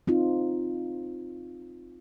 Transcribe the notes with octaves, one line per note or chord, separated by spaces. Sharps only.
C4 D#4 F4